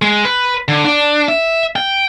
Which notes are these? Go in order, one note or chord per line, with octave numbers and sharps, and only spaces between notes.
G#3
B4
D3
D4
E5
G5